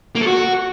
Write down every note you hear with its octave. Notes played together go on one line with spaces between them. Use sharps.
A#3
A4
F#4